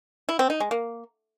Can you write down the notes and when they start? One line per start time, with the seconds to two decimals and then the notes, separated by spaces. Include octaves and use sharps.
0.29 E4
0.39 C4
0.50 D#4
0.60 G#3
0.71 A#3